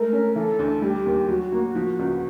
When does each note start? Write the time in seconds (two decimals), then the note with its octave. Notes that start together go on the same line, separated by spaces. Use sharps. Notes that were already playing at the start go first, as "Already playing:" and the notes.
Already playing: G#3 A3 A#4
0.12 C#4
0.36 E3 A4
0.59 D2
0.82 G3 G4
1.06 D#2
1.28 F#3 F#4
1.52 A#3
1.75 F3
1.99 C#2